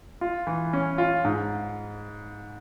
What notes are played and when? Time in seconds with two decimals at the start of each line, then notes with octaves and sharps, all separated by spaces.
0.21 F4
0.47 E3
0.73 C#4
0.98 F4
1.25 G#2